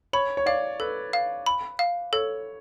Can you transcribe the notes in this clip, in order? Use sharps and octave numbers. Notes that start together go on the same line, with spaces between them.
C#5 B5
C#5
D5 F5
A4 B4
F5
B5
F5
A4 C#5